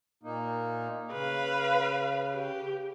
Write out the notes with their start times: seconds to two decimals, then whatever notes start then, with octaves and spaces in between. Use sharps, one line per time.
0.23 A#2 A#3 D#4
1.12 C#3 B4 F5
2.34 G4